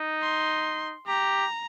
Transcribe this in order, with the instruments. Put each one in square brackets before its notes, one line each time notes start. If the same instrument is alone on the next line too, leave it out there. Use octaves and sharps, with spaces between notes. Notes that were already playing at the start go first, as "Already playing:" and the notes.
Already playing: [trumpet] D#4
[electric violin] C6
[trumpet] G4 [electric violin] A#5